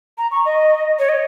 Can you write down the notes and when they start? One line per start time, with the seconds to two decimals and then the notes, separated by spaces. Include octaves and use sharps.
0.18 A#5
0.31 C#6
0.45 D#5
0.99 C#5
1.09 D#5